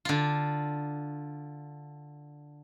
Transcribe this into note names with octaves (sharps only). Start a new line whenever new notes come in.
D3 F4